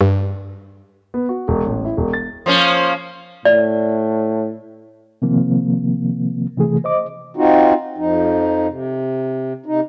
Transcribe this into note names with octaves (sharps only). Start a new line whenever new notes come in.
G2
B3
F#4
E1
A1
E4
E1
A6
F3 A#3 C#4
A2 D5
C3 D#3 F3 A#3 C4
C3 E3 A3 G#4
C5 D#5 D6
C4 D#4 F4 F#4
F2 F3 D#4
C3
C3 D#4